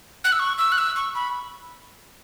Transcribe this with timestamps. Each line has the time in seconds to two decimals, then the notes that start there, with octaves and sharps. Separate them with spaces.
0.24 F#6
0.32 E6
0.39 C#6
0.58 E6
0.72 F#6
0.78 E6
0.96 C#6
1.15 B5